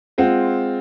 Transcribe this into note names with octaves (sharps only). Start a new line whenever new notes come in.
G#3 C4 F4 F#5